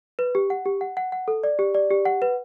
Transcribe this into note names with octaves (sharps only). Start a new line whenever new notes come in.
B4
G4
F#5
G4
F#5
F#5
F#5
A4
D5
G4
D5
G4
F#5
B4